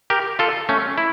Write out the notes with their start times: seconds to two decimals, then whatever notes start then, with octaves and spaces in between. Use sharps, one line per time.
0.10 G4 A#4
0.39 F4 A4
0.69 A3 C#4
0.98 E4